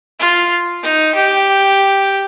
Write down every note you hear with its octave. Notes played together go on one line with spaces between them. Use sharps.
F4
D#4
G4